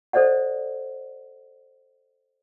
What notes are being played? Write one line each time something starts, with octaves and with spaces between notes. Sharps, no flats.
A4 C5 D5 D#5 F#5